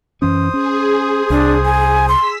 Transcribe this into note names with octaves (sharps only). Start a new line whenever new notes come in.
F#2 E3 C#4 C5 D#6
C#4 G#4
C2 D4
G#5
C6 E6 B6